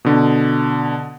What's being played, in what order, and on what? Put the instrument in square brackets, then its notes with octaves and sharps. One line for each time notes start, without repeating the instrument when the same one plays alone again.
[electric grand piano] B2 D3